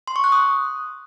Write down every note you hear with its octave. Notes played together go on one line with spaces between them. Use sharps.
C6
C#6
F#6
D#6